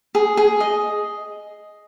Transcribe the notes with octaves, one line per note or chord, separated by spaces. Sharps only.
G#4
G#4
D#5